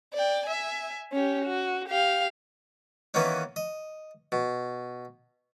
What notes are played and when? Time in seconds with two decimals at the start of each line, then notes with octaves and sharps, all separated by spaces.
0.13 D5 G5
0.46 E5 G#5
1.12 C#4 G4
1.44 F#4
1.88 G4 F5
3.14 D#3 E3 A#3 B3 C#4 D#4
3.56 D#5
4.32 B2